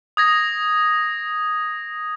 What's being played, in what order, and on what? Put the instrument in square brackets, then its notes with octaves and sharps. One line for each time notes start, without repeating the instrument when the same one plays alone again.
[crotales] D#6 G#6 A#6